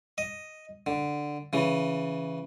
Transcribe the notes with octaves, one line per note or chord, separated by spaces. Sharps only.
D#5
D3
C#3 E3